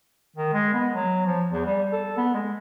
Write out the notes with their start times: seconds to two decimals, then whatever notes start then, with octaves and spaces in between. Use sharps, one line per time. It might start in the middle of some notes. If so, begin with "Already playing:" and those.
0.36 D#3
0.53 G#3
0.73 B3
0.93 F#3
1.26 F3
1.52 E2
1.66 G3
1.93 A4
2.17 B3
2.34 G#3